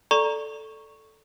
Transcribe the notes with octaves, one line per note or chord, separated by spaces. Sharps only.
A4 D5 A#5 C#6